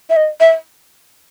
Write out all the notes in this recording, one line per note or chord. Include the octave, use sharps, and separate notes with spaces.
E5
D#5
E5